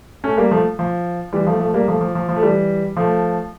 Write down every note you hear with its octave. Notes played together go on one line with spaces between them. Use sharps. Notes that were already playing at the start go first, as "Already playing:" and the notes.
A3 C#4
G3 A#3
F3 A3
F3
E3 G3
F3 A3
F3 A3
G3 A#3
F3 A3
F3
F3
F3
A3
E3 G3
F3 A3